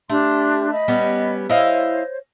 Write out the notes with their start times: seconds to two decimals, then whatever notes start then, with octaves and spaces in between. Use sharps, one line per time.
0.09 A3 D4 G4 C6
0.72 D#5 B5
0.88 G3 B3 C#4
1.50 E4 C5 C#5 D#5 F5